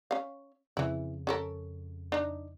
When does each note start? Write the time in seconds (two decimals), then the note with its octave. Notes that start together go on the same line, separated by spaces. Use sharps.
0.11 C#4 F5
0.77 F2 C#3 E3 E4
1.27 C#4 A4 A#4
2.12 D4 D#4